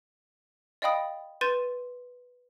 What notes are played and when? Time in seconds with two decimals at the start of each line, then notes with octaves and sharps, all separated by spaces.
0.82 D5 D#5 F5 G5 B5 D#6
1.41 B4 C6 G6 A6 D#7 E7